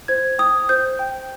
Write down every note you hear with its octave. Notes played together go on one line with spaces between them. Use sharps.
C5 G#6
G5 D#6
C5 G6
G5